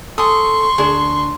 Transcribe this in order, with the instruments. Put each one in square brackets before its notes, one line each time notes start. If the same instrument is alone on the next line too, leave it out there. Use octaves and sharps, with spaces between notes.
[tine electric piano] A4 [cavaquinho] G#5 D#6 [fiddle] C6 C#6
[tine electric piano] D2 D4 [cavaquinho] G#4